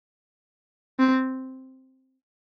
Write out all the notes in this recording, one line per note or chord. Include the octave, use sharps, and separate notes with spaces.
C4